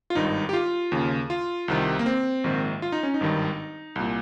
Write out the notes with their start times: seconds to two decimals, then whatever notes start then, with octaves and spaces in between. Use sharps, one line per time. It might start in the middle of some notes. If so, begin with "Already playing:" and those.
0.10 F4
0.15 G#1 G2 D#3 D#4
0.49 G4
0.53 F4
0.92 D#2 C#3
1.30 F4
1.68 C2 C3 D#3
1.99 A#3
2.06 C4
2.44 A#1 G#2 D#3
2.82 F4
2.92 D#4
3.03 C#4
3.14 D#4
3.20 G#1 G2 D#3
3.96 C2 A#2